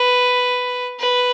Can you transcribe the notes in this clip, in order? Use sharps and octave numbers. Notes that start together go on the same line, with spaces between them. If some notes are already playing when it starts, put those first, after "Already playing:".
Already playing: B4
B4